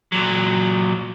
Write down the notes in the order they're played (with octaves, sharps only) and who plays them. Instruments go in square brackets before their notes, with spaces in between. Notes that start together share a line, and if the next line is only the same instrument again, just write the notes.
[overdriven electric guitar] A#2 F#3